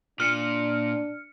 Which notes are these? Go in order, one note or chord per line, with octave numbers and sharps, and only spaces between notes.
A#2 D4 F6 C#7